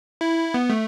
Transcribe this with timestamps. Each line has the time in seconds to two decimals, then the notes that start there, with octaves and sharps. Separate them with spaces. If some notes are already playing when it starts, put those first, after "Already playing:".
0.21 E4
0.54 B3
0.70 A3